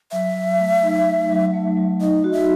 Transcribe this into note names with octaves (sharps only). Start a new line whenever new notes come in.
F#3 E5
F#3
A3
D#4
A3
F#3
A3
F#3
D#4 D#5
F#4
E5